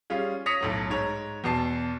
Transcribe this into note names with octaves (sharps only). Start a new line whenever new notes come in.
G3 C#4 F4 G#4
C#5 D#6 A#6 B6 C#7 F7
B1 A2 F#3
G#2 C#5 A#5
E2 B2 A5 C7